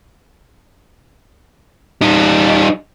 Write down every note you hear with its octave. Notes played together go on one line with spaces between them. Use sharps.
G3 D#4